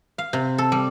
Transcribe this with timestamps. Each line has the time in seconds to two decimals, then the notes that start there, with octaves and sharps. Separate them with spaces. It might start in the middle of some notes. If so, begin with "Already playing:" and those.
0.18 F5
0.33 C3
0.58 A4
0.72 G3